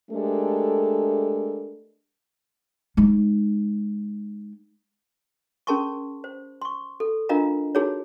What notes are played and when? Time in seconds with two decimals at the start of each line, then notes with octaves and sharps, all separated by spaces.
0.11 G#3 A3 D4 G4 A4 A#4
2.97 G#3 D#4
5.67 C#4 G#4 A#4 A5 C6 C#6
6.24 C5
6.62 C6 C#6
7.00 A4
7.29 D4 F4 A#4 D#5 F5 A#5
7.75 D#4 F#4 G#4 A#4 C#5